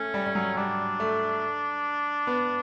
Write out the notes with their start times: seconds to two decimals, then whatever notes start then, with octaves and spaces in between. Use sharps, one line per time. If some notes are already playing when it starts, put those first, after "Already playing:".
Already playing: A3 C#4
0.14 G3
0.27 G3
0.35 F#3
0.56 G3 D4
1.00 A3
2.27 B3